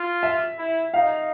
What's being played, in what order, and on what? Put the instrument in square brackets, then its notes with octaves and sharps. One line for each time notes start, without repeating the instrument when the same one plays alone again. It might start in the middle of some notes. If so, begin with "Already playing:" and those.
Already playing: [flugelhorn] F4
[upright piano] E5
[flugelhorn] E4
[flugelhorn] D#4 [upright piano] F5